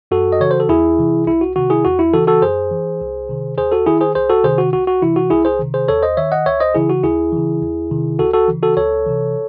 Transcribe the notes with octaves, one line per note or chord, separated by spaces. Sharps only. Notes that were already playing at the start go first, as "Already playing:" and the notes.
F#2 F#4 A4
D#5
C#3 E3 C#5
C5
A4
E2 E4 G#4
C3 E3
C2 E4
F#4
C3 D#3 F#4
E4 G#4
E2 F#4
E4
C#3 E3 F#4 A4
F#4 A4
F#2 G#4 C5
E3
C2
C3 D#3
D#2 G#4 C5
F#4 A4
D#3 E4 G#4
G#4 C5
C2 G#4 C5
F#4 A4
C3 D#3 G#4 C5
F#4
C2 F#4
F#4
C3 E3 E4
F#4
C2 E4 G#4
G#4 C5
C3 D#3
G#4 C5
D#2 A4 C#5
C5 D#5
D#3 C#5 E5
D#5 F#5
C#2 C#5 E5
C5 D#5
C#3 E3 E4 G#4
F#4
D#2 E4 G#4
C#3 E3
E2
C3 D#3
C#2 F#4 A4
F#4 A4
C#3 E3
F#4 A4
C#2 A4 C#5
C3 E3